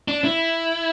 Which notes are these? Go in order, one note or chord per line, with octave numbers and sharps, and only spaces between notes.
D4
E4